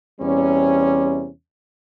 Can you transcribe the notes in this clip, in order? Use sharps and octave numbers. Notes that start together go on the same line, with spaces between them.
E2 C3 G3 C#4